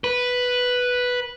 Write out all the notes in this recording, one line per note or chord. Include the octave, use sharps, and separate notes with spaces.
B4